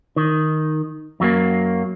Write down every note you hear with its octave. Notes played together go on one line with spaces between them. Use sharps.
D#3
F#2 F#3 G#3 A#3